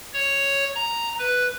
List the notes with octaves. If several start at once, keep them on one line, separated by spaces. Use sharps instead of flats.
C#5
A#5
B4